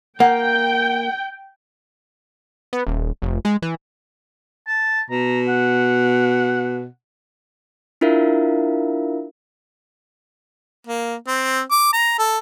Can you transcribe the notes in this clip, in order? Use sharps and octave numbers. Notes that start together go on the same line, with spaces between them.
A#3 F#5 G5
B3
D#1
F1
G#3
E3
A5
B2 A#5
F#5
D4 E4 F4 A#4 E5 F5
A#3
C4
D6
A#5
A4